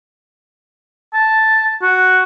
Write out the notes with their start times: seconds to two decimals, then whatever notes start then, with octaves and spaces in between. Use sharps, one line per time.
1.14 A5
1.82 F#4